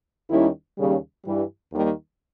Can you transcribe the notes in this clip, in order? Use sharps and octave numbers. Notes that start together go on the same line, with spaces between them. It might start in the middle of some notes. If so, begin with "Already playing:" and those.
D#2 D#3 G3 C#4 E4
D#2 C#3 G3
G2 E3 G3
D#2 D#3 G3 A#3